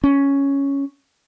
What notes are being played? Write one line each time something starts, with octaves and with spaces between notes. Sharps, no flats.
C#4